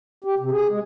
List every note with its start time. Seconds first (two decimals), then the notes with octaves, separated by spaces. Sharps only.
0.24 G4
0.39 C3
0.51 G#4
0.69 G#3